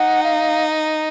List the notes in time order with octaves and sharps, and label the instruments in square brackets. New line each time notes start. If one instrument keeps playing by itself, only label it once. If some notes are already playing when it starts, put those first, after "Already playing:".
Already playing: [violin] D#4 [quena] F#5
[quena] F5